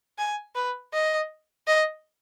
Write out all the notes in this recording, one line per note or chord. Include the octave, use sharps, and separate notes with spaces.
G#5
B4
D#5
D#5